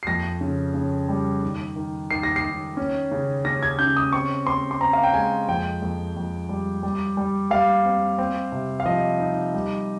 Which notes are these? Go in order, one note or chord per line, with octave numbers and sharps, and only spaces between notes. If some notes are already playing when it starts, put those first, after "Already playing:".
C7
F2 A#6
C#3
C#3
G3
D#3
D#3
D#3 C7
A#6
C7
D#3
C#4
C#3
C#4 A#6
G#6
C#3 G6
D#6
C4 C#6
C4 C6
C6
C4 A#5
F5
G5
G#3 G#5
F2 G5
F2
F2
G3
G3
G3
G3 F5
C4
C4
C3
F5
F3 D#5
D#4
G3